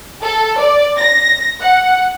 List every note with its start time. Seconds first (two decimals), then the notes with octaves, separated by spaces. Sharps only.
0.22 A4
0.59 D5
0.97 A#6
1.61 F#5